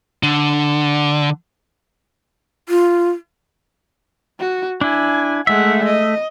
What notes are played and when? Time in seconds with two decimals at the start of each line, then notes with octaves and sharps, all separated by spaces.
0.23 D3
2.69 F4
4.39 F#4
4.81 D4 E4 G#5
5.47 G#3 A3 E5 F#5
5.85 D#5